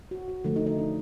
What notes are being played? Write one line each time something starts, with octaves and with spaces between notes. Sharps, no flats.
F#4
F#4
D3 F3 A3
D#4
D#4
D4